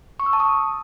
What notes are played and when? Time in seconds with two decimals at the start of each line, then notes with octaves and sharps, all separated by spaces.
0.20 C#6
0.26 E6
0.33 A5
0.40 D#6